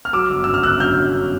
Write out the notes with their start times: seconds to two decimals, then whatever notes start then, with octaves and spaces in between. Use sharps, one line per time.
0.05 F6
0.13 F#3 D6 E6
0.30 G1
0.44 F#2 E6
0.54 F6
0.63 G1 E6 F#6
0.80 F#3 F6 G6
0.98 F#2